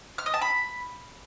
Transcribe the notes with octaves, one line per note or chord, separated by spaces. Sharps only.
F6
D#5
A5
B5